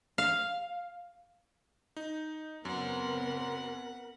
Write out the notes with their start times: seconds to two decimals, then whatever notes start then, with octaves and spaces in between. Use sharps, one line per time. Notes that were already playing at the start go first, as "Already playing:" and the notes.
0.18 F5
1.97 D#4
2.65 F#2 C#3 B3 C4 A#4 B4 F#5